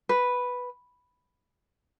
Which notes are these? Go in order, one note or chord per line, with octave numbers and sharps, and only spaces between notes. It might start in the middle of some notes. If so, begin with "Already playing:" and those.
B4